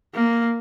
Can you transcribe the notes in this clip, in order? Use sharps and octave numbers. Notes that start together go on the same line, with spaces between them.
A#3